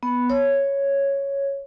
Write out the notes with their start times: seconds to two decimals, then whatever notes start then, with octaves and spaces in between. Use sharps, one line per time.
0.03 B3
0.30 C#5